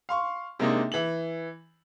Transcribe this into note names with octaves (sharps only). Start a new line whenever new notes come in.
F5 C6 C#6
C3 G#3 A#3 D4 D#4
E3 F#7